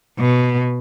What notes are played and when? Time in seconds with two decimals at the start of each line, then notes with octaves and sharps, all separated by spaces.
0.19 B2